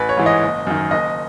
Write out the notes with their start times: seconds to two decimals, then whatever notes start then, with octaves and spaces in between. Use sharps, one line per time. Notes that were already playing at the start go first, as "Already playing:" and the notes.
Already playing: A1 B4
0.09 C#5
0.17 G#2 E3
0.26 D#5
0.42 F#1
0.67 F#2 D#3
0.91 F#1 D#5